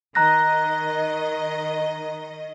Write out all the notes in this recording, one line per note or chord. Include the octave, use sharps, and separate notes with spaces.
D#3 D#5 A#5 F#6 A#6